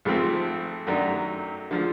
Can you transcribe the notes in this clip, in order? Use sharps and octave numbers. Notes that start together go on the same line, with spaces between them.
G#1 G#2 F3 A3 C4
F#2 D#3 F#3 A3 D4
D3 F3 G#3